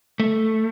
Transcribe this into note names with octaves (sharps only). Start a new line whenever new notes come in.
A3